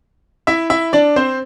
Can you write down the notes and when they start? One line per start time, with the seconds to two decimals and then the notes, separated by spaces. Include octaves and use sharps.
0.47 E4 E5
0.70 E4 E5
0.93 D4 D5
1.16 C4 C5